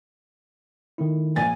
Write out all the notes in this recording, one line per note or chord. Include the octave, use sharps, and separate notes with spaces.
D#3 A3 E4
A#1 G#5 A6